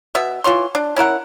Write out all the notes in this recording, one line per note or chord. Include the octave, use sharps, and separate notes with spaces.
B2 B3 E5
E3 F4 C#5 C6
D4
C#4 E4 A#4 F#5